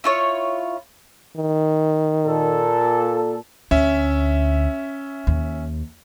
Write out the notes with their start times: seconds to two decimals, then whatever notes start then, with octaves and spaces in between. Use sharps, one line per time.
0.04 E4 F4 C#5
1.37 D#3
2.25 A#2 A4
3.71 D2 C#4 E5
5.27 D#2